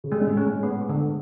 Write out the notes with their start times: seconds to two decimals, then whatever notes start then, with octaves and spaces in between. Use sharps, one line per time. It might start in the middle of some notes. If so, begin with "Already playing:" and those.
0.04 C#3
0.11 C3 G#3
0.21 A2
0.28 G#2
0.37 C#4
0.46 A2
0.63 B3
0.89 D3